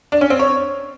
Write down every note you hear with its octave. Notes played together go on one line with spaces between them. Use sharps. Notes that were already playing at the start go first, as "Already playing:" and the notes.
D4
C#4
C4
C#5